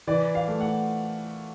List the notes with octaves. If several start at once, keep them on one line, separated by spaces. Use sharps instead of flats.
E3 D5
F5
A3
F#5